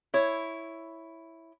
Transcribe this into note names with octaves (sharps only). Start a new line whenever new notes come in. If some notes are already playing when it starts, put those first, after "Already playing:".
E4 C#5